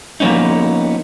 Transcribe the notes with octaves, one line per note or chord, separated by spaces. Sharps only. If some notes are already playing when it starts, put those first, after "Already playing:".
F3 A#3 B3 C#4 D#4